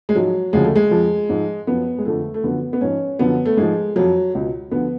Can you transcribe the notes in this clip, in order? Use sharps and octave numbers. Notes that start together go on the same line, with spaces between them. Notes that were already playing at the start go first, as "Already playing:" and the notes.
G#3
G#2 F3 F#3
D2 C#3 F3 G#3
A3
G#3
F2 F3
G#2 F3
F#2 F3 B3
G#3
F2 D3 F3 A3
A3
F#2 D3 F3 B3
B3
G#2 F3 C#4
F#2 D3 F3 B3
A3
G#2 F3 G#3
F2 F3 F#3
C#2 B2
D2 D3 F3 B3